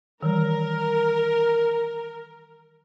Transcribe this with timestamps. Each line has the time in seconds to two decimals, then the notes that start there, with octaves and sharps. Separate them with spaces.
0.23 D#3 E3 G3 A#4